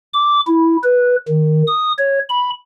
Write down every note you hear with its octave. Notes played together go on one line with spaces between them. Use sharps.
D6
E4
B4
D#3
D#6
C#5
B5